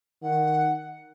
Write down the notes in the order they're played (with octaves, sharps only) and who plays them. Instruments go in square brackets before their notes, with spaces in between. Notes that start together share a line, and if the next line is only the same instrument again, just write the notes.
[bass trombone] D#3 [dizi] F#5